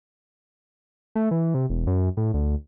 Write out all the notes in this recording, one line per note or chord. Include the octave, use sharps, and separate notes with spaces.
A3
E3
C3
E1
F#2
A2
D2